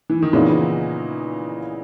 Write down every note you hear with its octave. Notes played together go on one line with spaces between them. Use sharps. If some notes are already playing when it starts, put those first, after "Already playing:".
E3
D#3
A#2 C#3 E3 B3 D#4